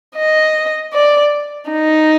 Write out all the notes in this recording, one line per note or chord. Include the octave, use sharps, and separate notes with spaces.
D#5
D5
D#4